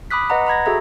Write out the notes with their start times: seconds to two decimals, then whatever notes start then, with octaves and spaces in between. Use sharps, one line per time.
0.11 B5 D6 D#6 F#6 B6
0.30 B4 D#5 F#5 A#5
0.47 A#5 B5 G#6 A#6
0.66 F#4 G#4 A4 E5 A#5